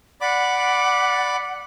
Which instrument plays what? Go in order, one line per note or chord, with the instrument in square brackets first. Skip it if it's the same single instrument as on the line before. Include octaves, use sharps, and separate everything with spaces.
[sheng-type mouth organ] D5 B5 D6 [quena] F#5